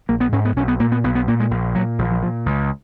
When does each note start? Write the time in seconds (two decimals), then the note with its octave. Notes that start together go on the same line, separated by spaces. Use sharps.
0.09 A#1 A#3
0.20 B3
0.32 G#2 C#4
0.45 B3
0.56 B1 C#4
0.68 B3
0.79 A#2 A#3
0.92 B3
1.04 B1 B3
1.15 B3
1.28 A#2 A#3
1.40 G#3
1.51 A#1
1.74 A#2 F#3
1.98 A#1 F3
2.11 F3
2.23 A#2 F3
2.46 C#2